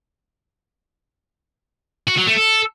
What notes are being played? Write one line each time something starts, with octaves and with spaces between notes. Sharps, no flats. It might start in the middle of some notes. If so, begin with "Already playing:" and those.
F#4
F#3
A3
A4